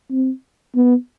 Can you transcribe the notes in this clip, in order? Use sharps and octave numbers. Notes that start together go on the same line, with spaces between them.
C4
B3